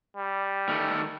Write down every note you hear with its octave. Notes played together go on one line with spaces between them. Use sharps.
G3
D#3 A3